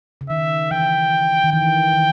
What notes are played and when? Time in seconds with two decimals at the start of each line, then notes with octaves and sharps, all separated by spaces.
0.21 C#3
0.30 D#3 E5
0.71 E3 G5
1.44 D#3
1.52 E3 G5
1.93 D#3